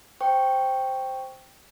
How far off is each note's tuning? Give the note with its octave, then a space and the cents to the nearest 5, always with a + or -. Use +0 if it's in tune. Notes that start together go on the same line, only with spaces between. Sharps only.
C5 +0 G5 +0 C#6 +0